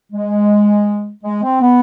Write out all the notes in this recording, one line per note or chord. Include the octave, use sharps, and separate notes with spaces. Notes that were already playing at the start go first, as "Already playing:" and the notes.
G#3
G#3
C4
B3